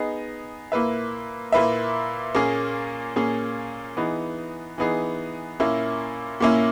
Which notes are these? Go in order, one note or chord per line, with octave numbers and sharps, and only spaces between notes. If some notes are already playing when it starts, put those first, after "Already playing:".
Already playing: B3 D#4 G#4 D#5
A#2 A#3 E4 B4 E5
A#2 A#3 E4 B4 E5
A#2 A#3 C#4 G#4
A#2 A#3 C#4 G#4
E3 B3 D#4 G#4
E3 B3 D#4 G#4
A#2 A#3 C#4 E4
A#2 A#3 C#4 E4